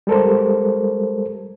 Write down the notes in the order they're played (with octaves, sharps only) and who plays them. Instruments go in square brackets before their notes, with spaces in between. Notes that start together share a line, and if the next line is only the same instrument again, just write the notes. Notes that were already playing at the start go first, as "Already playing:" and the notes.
[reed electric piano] G3 G#3 A4 A#4 C5